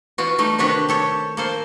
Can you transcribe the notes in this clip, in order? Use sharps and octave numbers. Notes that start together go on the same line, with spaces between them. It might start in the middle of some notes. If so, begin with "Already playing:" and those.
E3 B3 F4 F#4
G3 A3 D#4
C3 D#3 D4 F#4 G4 B4
G4 A4 C#5
A#3 A4 C5